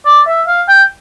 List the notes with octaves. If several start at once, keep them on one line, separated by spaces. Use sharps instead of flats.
D5
E5
F5
G5